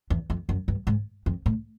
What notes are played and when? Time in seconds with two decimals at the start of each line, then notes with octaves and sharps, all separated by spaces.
0.10 E2
0.30 F2
0.49 F#2
0.68 G2
0.87 G#2
1.26 F2
1.46 A2